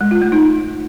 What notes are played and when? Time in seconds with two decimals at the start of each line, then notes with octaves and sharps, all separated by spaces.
0.01 G#3
0.11 F4
0.22 A3
0.32 D#4